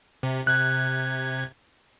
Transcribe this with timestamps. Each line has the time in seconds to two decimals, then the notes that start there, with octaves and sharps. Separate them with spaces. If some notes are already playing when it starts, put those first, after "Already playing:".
0.23 C3
0.47 C3 F#6 G#6